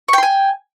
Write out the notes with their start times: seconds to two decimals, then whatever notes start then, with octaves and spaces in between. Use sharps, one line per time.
0.08 C#6
0.13 G5
0.18 C6
0.23 G#5